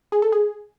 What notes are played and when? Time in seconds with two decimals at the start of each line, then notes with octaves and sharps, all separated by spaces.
0.12 G#4
0.22 A4
0.32 G#4